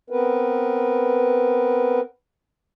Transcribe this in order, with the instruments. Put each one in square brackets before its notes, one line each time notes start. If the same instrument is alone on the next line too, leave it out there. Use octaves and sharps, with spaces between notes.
[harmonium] B3 C4 A#4 B4